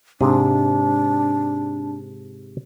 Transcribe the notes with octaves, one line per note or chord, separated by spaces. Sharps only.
G#2 C3 D4 G#4